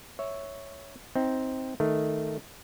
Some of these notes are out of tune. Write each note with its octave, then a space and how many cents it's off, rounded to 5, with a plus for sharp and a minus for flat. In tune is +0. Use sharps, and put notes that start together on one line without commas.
C#5 +0 E5 -5
C4 +0 D#4 +25
D#3 +0 A3 +0